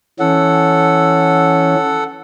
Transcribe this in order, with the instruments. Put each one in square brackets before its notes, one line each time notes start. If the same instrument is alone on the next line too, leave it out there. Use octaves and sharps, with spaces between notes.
[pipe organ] E3 C#4 [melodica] A4 F#5